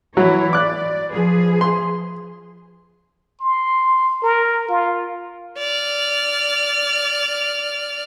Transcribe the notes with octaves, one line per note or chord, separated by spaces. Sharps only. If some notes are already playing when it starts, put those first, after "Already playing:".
E3 F#3 E4 C#5
D5 D6 F#6
F3 G#4 B4
C6
C6
A#4
F4
D5 F6